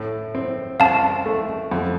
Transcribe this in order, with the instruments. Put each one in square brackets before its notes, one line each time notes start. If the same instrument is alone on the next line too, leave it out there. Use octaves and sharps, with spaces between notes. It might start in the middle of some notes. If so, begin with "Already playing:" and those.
Already playing: [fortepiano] A2
C4
[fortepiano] C2 [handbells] F5 A5
[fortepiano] A3
F2